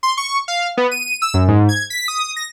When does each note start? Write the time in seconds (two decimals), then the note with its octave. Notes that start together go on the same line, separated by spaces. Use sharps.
0.03 C6
0.17 C#6
0.48 F5
0.77 B3
0.91 D#7
1.22 E6
1.34 F#2
1.48 G#2
1.69 G#6
1.90 B6
2.08 D#6
2.36 A#6